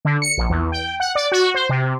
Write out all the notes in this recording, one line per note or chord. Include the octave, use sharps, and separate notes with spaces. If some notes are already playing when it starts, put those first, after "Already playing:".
D3
C#7
A#1
E2
G5
F#5
D5
F#4
C5
C3